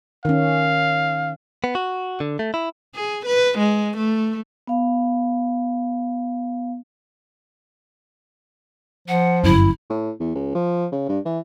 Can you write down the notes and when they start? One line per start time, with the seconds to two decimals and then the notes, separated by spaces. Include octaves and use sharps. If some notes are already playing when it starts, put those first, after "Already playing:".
0.25 D#3 C#4 F5
1.64 B3
1.75 F#4
2.20 D3
2.39 A3
2.54 E4
2.95 G#4
3.26 B4
3.58 G#3
3.97 A3
4.67 B3 F5
9.08 F3 F#5
9.44 G1 F#2 E4
9.90 A2
10.20 E2
10.35 C#2
10.55 F3
10.92 C#3
11.09 G2
11.26 E3